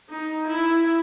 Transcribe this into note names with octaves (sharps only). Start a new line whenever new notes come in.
D#4
E4